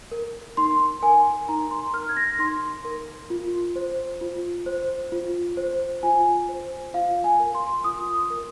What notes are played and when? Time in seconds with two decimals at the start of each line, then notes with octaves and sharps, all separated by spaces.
0.12 A#4
0.57 D#4 C6
1.02 A#4 G#5
1.48 D#4 A#5
1.71 C6
1.94 A#4 F6
2.09 G#6
2.17 A#6
2.39 D#4 C6
2.85 A#4
3.30 F4
3.76 C5
4.21 F4
4.66 C5
5.12 F4
5.57 C5
6.03 F4 G#5
6.49 C5
6.94 F4 F5
7.24 G#5
7.39 A#4
7.55 C6
7.84 F4 D#6
8.30 A#4